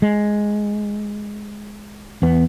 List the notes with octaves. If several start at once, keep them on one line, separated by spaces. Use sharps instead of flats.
G#3
E2 B3